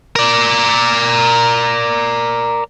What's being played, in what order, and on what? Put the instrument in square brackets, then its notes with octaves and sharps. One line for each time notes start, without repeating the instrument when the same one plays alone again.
[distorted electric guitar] A#4 D5